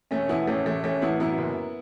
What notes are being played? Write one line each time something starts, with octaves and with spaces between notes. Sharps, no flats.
E1 A3 C#4
E2 B3 E4
A1 A3 C#4
A1 A3
A1 A3 C#4
A1 B3 E4
F#2 B3 E4
F#1